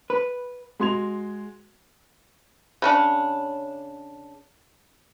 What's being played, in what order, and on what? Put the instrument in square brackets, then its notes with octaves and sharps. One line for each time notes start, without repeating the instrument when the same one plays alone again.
[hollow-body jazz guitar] B4
[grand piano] G#3 F#4 C6 G#6 F7
[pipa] C#3 C#4 D4